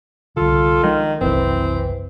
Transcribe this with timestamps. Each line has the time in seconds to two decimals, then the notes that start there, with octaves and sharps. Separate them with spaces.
0.37 C2 D3 F4 A4
0.83 D#3 F3 G#3 D4
1.21 F#1 C2 E3 C4